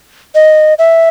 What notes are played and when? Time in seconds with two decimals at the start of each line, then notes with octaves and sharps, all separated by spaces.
0.35 D#5
0.78 E5